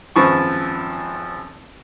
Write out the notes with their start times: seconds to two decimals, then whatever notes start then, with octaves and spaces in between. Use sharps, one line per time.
0.16 G#1 F#2 F3 B4 C#6